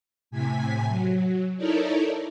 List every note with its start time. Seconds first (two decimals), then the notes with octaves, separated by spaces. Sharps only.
0.31 A2 C3 G#5 B6
0.87 F#3
1.57 D#4 E4 A4 A#4 C#5 D5